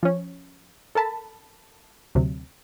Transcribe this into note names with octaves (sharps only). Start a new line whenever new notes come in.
F3 C#4
A4 A#4 A5 B5
D2 C3 F#3